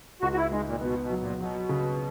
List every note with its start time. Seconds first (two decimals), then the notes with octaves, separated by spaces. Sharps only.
0.22 C#2 F#4
0.32 F#4
0.37 E4
0.51 G#3 D#4
0.66 A#2
0.81 B2 B3
1.01 B2
1.10 F#3
1.20 A#2
1.40 B2 F#3
1.69 C#3